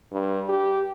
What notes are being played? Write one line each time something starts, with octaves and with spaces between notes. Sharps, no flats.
G2
G4